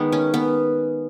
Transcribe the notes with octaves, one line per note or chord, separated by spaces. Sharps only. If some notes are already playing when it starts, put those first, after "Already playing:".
Already playing: D#3 G#3 B3
C#4
B3